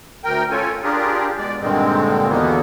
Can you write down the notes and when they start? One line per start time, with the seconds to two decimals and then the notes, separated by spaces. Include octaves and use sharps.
0.24 D2 A#4 G5
0.50 C#4 F4 A4 C#5 G#5
0.83 D4 F4 G4 G#4 A#4
1.38 B2 G#3 D5
1.61 G2 A#2 D3 D#3 G#3 C4
2.29 E2 B2 D3 A#3 B3